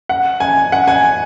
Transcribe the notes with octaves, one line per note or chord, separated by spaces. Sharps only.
F#5
G#5
F#5
G#5